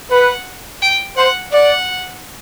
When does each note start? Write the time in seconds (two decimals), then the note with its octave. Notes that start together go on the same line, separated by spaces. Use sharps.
0.11 B4 F#5
0.82 G5
1.17 C5 F#5
1.52 D5 F#5